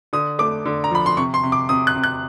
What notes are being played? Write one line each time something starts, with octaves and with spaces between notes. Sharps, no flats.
D3 D#6
A3 D6
D3
A#5
F3 B5
C6
C3 C#6
C6
C3
D6
C3 D#6
F#6
C3
F#6